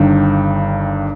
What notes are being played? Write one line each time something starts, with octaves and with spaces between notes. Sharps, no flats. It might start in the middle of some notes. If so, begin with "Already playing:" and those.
Already playing: G1 G2 D#3